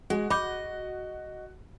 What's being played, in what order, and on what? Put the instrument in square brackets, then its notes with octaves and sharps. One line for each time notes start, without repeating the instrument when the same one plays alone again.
[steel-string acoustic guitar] G#3 [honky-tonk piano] F#4
[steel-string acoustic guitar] D#5 [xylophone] B5 D6 G6